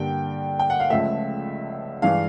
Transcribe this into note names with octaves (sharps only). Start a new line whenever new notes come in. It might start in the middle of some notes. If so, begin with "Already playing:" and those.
Already playing: G2 D3 G3 A#3 G5
G5
F#5
F5
C#2 C#3 F3 A3 E5
G2 E3 G#3 F5